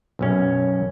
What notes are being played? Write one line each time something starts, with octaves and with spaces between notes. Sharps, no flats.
B1 F#2 C#4